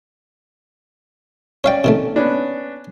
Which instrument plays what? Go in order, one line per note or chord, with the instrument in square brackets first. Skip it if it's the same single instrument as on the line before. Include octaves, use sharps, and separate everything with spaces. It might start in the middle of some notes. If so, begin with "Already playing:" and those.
[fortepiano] C#4 D5 [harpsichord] C#5 F5 G5
[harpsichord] C3 D#3 A3
[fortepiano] B3 C#4 D4